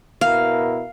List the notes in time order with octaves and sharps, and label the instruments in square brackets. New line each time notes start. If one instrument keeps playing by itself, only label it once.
[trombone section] B2 E4 A#4 [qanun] F5